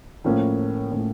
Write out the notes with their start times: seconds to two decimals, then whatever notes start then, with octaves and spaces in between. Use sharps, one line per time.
0.24 A2 F3 A#3 C#4
0.92 A2 F3 A#3 C#4